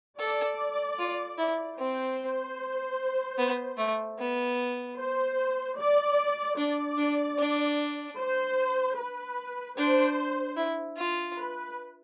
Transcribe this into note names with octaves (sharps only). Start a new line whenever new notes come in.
A4 D5
F4
E4
C4 C5
B3
A3
B3
C5
D5
D4 D5
D4
D4
C5
B4
D4 C5
E4
F4
B4